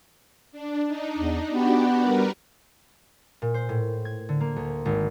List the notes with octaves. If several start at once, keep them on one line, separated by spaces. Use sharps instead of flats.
D4
D4 D#4
E2
B3 D4 F#4 G4
G3 A#4 B4
A#2
C5
A2
G#6
D3
A#3
D2
G#1